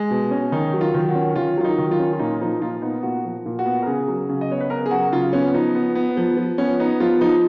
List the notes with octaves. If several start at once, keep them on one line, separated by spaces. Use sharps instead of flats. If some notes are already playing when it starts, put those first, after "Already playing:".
Already playing: G#3
B2
C#4
D#3 D#4
F#3
F4
D#3
F#4
C#4
D#3 F4
F#3 F4
D#4
D#3
F4
C#4
F4
A#2 D#4
F3 D#4
A#2 F4
B3 D#4
A#2 F#4
F3
A#2
F#4
B3
A#4
C#3 G#4
F#3
C#3
D#5
B3 C#5
B4
C#3 A#4
G#4
F#3 F#4
C#3 F4
B3 C#4
F3 D#4
B3
B3
F3
F3
B3 C#4
B3 D#4
F3 F4
F3 D#4